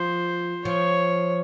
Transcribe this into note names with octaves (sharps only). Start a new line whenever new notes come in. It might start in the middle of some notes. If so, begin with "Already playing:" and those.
Already playing: F3 C5
F3 C#5